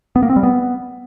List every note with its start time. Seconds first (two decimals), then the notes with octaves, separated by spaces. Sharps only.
0.16 B3
0.23 A#3
0.29 C4
0.36 G3
0.43 B3